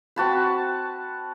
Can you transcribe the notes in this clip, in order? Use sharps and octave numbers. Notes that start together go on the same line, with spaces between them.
C4 F#4 A5 B5